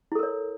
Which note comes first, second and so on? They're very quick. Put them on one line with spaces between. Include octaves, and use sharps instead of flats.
E4 A4 A#4 C#5